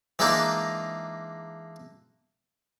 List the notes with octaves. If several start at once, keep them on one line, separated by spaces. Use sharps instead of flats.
E3 G#3 A#3 D4 D#4